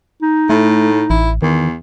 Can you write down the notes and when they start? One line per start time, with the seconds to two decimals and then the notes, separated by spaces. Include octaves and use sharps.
0.22 D#4
0.50 A2 A3
1.10 A1 E4
1.42 E2 D#3